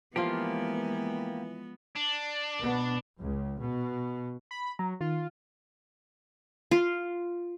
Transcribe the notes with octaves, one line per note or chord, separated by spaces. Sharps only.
E3 F3 G#3 A#3 B3 F4 G4
D4
B2 B3
C#2
B2
B5
F#3 A#5
D#3 F4
F4